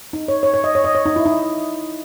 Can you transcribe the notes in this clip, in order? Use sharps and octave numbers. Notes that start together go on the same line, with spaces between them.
D#4
C#5
C#5
C#5
D#5
C#5
D#5
C#5
D#4
E4
D#4